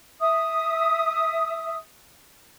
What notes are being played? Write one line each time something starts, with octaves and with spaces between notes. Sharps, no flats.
E5 D#6